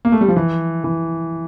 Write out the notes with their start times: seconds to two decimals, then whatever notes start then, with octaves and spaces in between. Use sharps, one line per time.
0.05 A#3
0.12 A3
0.21 G3
0.28 F3
0.36 E3
0.84 E3